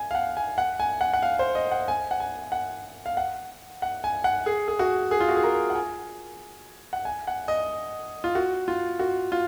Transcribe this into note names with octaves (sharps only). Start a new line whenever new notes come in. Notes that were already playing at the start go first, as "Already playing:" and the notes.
Already playing: G#5
F5
F#5
G#5
F#5
G#5
F#5
F#5
F5
C5
D#5
F#5
G#5
F#5
G#5
F#5
F5
F#5
F#5
G#5
F#5
G#4
G#4
F#4
G#4
F4
F#4
G#4
A#4
F#5
G#5
F#5
G#5
F#5
D#5
F4
F#4
F4
F#4
F4